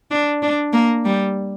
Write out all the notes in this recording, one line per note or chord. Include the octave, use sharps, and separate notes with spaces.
D4
D4
A#3
G3